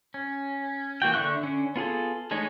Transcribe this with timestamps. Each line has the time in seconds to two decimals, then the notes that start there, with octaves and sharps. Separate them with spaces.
0.14 C#4
1.02 E3 A#3 F#4 G5
1.14 D3 E5 C#6 F#6
1.43 D3 C#4
1.76 B3 F4 G#4 A4
2.31 E3 G#3 A3 D#4 C#5